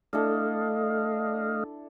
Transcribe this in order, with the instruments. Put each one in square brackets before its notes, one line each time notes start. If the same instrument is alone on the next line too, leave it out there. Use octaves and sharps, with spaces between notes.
[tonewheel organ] A3 D#5 F5 [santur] D4 E4 A4